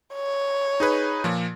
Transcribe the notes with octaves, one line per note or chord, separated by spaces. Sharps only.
C#5
D#4 G#4 B4
A#2 F3